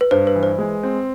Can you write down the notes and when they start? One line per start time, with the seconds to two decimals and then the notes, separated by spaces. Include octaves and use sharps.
0.01 B4
0.11 G2 C5
0.27 B4
0.35 E3
0.43 C5
0.58 G#3
0.83 C4